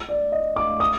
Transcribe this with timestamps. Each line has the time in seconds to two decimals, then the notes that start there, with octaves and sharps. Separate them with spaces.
0.09 D5
0.32 D#5
0.56 D6
0.80 D#6